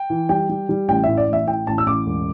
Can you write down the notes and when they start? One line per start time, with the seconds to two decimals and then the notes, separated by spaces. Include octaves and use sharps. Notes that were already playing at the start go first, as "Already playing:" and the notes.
Already playing: G5
0.10 E3
0.29 G3 G5
0.49 G3
0.69 G3
0.88 A1 G5
1.04 A2 E5
1.18 D5
1.28 A1
1.33 E5
1.47 A2 G5
1.67 A1 A5
1.78 E6
1.86 A1 D6
2.06 E1